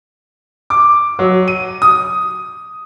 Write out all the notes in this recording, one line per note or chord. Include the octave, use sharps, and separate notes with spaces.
D6
F#3
D#7
D#6